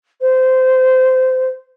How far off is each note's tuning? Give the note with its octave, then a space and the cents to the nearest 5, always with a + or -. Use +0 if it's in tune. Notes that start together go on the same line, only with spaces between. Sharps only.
C5 -20